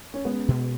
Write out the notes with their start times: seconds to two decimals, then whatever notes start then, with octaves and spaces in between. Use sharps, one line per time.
0.14 C#4
0.25 G#3 B3 C#4
0.48 B2